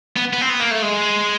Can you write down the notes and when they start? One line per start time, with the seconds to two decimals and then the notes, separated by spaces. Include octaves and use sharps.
0.16 B3
0.33 B3
0.41 C4
0.49 B3
0.60 A#3
0.71 A3
0.82 G#3